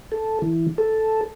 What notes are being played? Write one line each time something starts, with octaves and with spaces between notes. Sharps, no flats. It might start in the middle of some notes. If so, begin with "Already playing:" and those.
A4
E3
A4